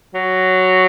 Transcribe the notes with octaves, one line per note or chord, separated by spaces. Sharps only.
F#3